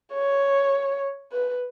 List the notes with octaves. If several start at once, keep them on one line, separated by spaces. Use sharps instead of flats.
C#5
B4